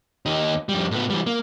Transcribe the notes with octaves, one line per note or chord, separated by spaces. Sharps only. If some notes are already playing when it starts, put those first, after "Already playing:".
D#2 D#4
F2 G3
A2 B3
E3 G3
A#3